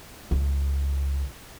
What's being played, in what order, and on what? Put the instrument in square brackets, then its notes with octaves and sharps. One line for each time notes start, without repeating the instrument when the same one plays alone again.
[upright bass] C#2